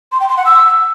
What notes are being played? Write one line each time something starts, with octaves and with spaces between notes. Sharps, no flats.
C6
G5
C6
F#5
E6